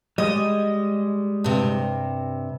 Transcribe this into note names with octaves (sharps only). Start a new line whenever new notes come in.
G3 G#3 D#5
G2 C3